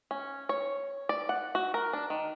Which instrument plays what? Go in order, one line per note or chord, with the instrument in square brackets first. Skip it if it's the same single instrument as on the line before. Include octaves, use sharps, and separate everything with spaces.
[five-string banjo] C#4
C#5
D5
F#5
F#4
A#4
D4
D#3